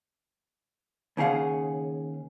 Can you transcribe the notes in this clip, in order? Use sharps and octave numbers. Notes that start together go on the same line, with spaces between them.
D#2 C#3 G#4 F5 F#5